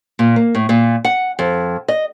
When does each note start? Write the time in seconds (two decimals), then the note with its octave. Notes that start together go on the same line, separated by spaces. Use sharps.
0.19 A#2
0.36 A#3
0.55 A2
0.69 A#2
1.05 F#5
1.39 F2
1.88 D#5